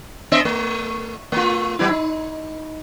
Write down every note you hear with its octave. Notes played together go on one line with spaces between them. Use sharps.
B3 D#5 E5
A3
A3 F4
F#3 B3 E4
D#4